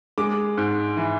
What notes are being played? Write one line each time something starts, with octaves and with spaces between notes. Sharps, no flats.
G#3 D6
G#2
E3